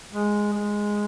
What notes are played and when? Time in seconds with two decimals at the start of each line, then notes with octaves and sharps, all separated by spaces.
0.12 G#3
0.53 G#3